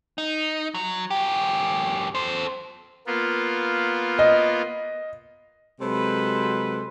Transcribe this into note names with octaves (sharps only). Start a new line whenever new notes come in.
D#4
F#3
F#2 G4
A4 C5
A#3 B3 F4
D#5
C3 F#3 G#3 A4 B4 C5